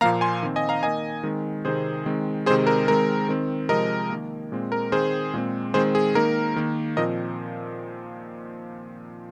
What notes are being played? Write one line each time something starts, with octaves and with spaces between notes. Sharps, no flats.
A#2 F3 A#3 F5 A#5
G#5 C6
D#3 C4
D#5 G#5
F5 A#5
D#3 A#3 D#5 G#5
D#3 G#3 C4
C3 D#3 C4 G#4 C5
D#3 G#3 C4
C3 D#3 G#3 C4 G#4 C5
A#4
D#3 G#3 C4 A#4
D#3 C4
C3 F3 G#3 A#4 D#5
D#3 A#3
A#2 G#3 C4
A#4
D#3 C4 G#4 C5
A#2 G#3 C4
D#3 G#3 C4 G#4 C5
G#4
D#3 A#3 A#4
D#3 A#3
A#2 F3 C4 A#4 D#5